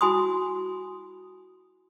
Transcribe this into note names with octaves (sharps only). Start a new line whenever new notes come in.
E4 F#4 G#5 B5 C6 D#6